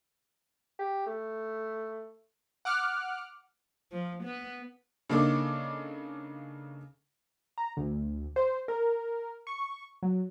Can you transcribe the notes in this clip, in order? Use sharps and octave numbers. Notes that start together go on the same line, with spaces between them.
G4
A3
F#5 D6 F6 F#6
F3
B3
C#3 A#3 D4 D#4 A4 D6
A#5
D2
C5
A#4
C#6
F#3